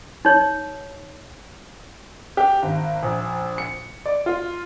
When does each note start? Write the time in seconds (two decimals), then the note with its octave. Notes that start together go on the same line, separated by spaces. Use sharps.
0.25 D#4 C#5
2.37 G4
2.62 G#1
3.03 A#1
3.58 C#7
4.06 D5
4.26 F4